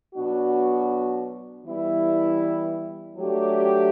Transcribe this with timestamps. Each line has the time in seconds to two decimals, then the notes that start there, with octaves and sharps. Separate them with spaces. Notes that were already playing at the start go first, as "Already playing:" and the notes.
0.14 B2 F#3 B3 D4 F#4
1.65 E3 G3 B3 E4
3.17 F#3 A3 D4 G4